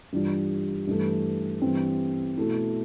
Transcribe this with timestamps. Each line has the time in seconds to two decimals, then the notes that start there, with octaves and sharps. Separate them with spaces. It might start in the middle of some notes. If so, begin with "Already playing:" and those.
0.13 G2 E3 G3 D4 F4
0.87 G2 E3 A3
1.62 G2 E3 G3 C4
2.37 B2 A3 E4